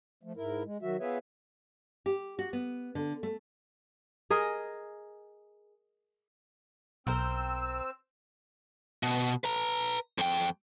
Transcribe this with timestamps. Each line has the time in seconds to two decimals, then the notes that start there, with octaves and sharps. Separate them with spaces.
0.23 F3 A3
0.37 G#2 E4 A#4
0.65 G#3
0.82 D#3 F#3 F#4 E5
1.00 B3 F4 G#4 B4 C#5 E5
2.06 G4
2.39 F#4
2.53 B3
2.95 D3
3.23 A3
4.30 G#4 A#4 D#5
7.07 B1 C4 A#4 C5 G5 E6
9.03 B2
9.44 B4 A#5
10.18 F2 G5